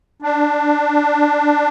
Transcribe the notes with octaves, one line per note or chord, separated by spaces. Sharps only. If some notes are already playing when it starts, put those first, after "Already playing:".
D4